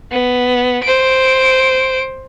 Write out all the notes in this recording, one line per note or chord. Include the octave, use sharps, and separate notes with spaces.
B3
C5 D7